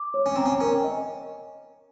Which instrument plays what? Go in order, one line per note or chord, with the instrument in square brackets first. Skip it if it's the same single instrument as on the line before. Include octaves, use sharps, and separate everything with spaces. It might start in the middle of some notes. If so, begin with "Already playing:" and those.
Already playing: [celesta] D6
C#5
[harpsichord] C#4
[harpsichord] C4 [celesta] A#5
[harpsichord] C#4
[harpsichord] C#4 [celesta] A#4
[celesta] D#5